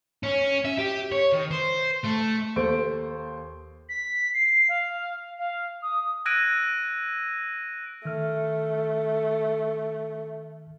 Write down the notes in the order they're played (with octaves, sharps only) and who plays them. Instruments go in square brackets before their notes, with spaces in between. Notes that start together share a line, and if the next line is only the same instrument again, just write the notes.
[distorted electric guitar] C#4
E5
G4
C#5
D#3
C5
A3
[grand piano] D#2 A4 C5 D7
[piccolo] B6
C7
F5
F5
D#6
[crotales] E6 F#6 G#6 A#6 D7 D#7
[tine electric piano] D#3 F6 [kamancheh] A3